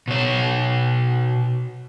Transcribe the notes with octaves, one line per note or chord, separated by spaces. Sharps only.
B2 C#5